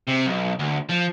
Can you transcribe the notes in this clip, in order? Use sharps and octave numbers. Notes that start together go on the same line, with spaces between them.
C3
B1
D2
F3